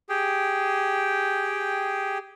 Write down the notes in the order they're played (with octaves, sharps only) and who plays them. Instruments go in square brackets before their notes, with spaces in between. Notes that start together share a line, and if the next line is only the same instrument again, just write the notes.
[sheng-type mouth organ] G4 G#4 G5